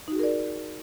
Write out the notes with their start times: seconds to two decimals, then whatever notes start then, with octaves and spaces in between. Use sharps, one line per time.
0.08 D#4
0.12 F#4
0.16 G#4
0.19 A#4
0.23 D5